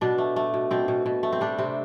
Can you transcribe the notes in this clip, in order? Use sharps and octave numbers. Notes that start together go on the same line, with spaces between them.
B2 D4
A3
A3
B2
B2 C4
B2
B2
A3
C4
G3 D4
C3 C4